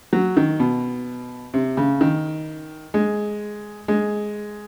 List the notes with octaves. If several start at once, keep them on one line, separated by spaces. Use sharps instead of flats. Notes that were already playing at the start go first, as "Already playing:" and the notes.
F#3
D#3
B2
C3
C#3
D#3
G#3
G#3